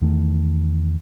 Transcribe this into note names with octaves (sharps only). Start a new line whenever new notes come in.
E2 D#3 A3